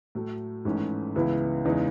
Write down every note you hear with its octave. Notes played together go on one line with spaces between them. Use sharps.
A2 F#3 A3
G#1 G#2 E3 A3 C#4
C#2 C#3 E3 B3 E4
E2 C#3 E3 G#3 D#4